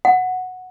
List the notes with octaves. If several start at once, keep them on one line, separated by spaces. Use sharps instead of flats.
F#5